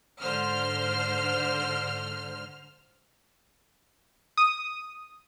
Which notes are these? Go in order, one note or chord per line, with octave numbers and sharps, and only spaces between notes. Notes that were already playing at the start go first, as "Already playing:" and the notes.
G#2 D3 C5 F6
D#6